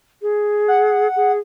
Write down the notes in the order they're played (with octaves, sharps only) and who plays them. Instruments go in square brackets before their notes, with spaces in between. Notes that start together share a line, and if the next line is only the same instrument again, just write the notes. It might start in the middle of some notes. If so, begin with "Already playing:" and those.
[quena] G#4
[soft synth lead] F#5
[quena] G#4